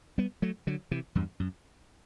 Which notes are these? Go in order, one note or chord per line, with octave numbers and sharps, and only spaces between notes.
G3 B3
F#3 A3
D3 F#3
C3 E3
E2 G2
F#2